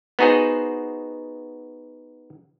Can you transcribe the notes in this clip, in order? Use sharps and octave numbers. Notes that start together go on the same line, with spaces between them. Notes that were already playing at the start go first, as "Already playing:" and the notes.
B3 D#4 F#4 G#4 C5